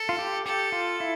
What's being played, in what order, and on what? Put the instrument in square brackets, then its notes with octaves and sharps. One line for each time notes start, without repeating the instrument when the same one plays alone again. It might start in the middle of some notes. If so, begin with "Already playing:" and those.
Already playing: [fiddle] A4
[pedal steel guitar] F4
G4
[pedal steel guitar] G4 [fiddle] A4
[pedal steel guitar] F4
E4